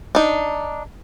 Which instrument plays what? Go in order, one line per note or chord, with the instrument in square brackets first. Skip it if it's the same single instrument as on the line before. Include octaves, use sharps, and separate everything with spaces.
[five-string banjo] D4 D#4